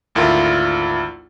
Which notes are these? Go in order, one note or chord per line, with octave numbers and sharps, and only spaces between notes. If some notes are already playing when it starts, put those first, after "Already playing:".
G#1 D2 E4 F4 A#4